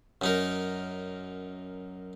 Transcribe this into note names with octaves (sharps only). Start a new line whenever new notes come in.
F#2 D#4 A#4